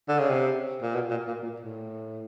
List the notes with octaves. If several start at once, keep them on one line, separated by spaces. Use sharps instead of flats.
D3
C#3
C3
A#2
B2
A#2
A#2
A#2
A2